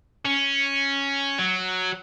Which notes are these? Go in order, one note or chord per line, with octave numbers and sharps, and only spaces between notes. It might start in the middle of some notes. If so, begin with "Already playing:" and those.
C#4
F#3